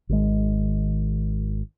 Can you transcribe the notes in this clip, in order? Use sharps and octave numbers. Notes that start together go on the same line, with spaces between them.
G#1 D#3 G#3